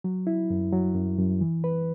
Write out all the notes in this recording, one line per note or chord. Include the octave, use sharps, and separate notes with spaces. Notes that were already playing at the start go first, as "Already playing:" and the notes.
F#3
E4
F#2
F#3
F#2
F#2
E3
B4